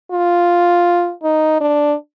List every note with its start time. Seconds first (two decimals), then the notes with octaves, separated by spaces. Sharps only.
0.12 F4
1.24 D#4
1.61 D4